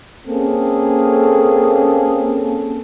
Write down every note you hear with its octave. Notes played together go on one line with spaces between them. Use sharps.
A#3 C4 C#4 G#4 A4